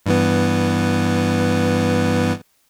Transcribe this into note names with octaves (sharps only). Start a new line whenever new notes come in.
G2 E3 B3